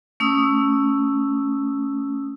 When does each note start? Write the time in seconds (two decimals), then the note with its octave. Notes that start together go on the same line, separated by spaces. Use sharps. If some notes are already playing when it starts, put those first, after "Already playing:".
0.20 A3 C#4 D#6 E6